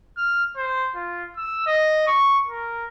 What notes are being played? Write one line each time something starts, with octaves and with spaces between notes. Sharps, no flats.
F6
C5
F4
E6
D#5
C#6
A#4